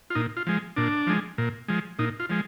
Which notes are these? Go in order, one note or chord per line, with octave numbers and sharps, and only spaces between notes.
F4
A#2 D#4
F4
F3 G#3
A#2 D4
F3 G#3
A#2
F3 G#3
A#2 D#4
F4
F3 G#3